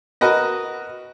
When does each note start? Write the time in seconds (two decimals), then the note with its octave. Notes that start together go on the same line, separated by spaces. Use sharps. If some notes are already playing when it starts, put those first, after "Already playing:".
0.21 F#4 A#4 B4 D#5